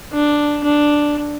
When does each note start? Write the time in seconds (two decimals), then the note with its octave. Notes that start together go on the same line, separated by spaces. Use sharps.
0.13 D4
0.64 D4